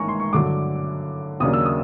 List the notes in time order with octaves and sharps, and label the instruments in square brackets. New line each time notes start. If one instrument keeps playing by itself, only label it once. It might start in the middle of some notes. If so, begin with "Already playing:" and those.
Already playing: [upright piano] A1 G#2 D#3 A#3 G#5 A#5 C#6
C6
C#6
G2 D3 F#3 D6
D#2 C#3 F#3 A#3 D4 D#6
E6
D#6